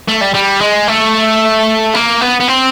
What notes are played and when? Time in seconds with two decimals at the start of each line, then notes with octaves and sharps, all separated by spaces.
0.08 A3
0.21 G3
0.35 G3
0.61 G#3
0.88 A3
1.94 A#3
2.21 B3
2.40 B3
2.48 C4